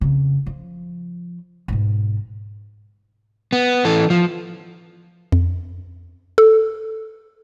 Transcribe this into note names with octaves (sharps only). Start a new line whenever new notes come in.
F2 C#3
F3
G#2 B2
B3
E3 A4
F3
F2
A4